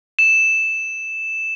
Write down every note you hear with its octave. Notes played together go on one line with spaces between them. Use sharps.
E7